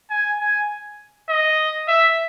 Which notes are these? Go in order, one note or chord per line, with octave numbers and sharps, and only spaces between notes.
G#5
G#5
D#5
E5